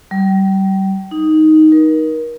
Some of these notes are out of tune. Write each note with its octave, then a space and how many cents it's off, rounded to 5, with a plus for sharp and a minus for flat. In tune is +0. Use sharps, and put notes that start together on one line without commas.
G3 -30
D#4 +5
A#4 +30